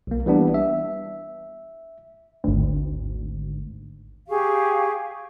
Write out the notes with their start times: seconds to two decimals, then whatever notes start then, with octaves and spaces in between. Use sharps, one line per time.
0.07 B1 A#3
0.26 E3 G3 B3 D4
0.54 E5
2.44 G#1 D2
4.29 G4 G#4 F5 C#6